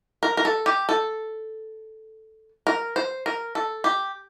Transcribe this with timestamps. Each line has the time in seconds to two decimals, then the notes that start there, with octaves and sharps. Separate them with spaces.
0.23 A#4
0.37 A#4
0.45 A4
0.66 G4
0.89 A4
2.67 A#4
2.96 C5
3.26 A#4
3.55 A4
3.84 G4